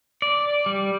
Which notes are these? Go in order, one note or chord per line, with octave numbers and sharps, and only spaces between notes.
D5
G3